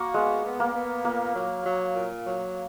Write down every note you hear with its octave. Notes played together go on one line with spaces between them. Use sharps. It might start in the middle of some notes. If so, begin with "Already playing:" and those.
Already playing: A#3 F#4
G#3 B3
B3
A#3
B3
A#2 A#3
F#3
F#3
A#2
F#3